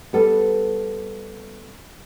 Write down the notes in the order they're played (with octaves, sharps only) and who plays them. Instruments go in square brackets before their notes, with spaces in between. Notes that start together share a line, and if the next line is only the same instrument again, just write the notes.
[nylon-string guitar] G3 B3 A4